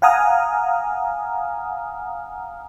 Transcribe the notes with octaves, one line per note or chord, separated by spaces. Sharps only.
F5 F#5 G#5 A#5 D#6 F6